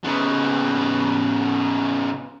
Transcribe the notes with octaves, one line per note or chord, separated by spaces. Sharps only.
C#3 B3